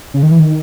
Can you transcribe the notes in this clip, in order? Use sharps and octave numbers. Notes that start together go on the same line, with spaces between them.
C#3
D#3
E3
D#3